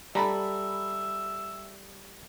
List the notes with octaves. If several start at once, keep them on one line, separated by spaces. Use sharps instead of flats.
G3 A4 E5 A#5 B5